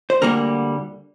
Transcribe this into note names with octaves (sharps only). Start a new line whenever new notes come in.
C5
D2 D3 G3 A#3 A#4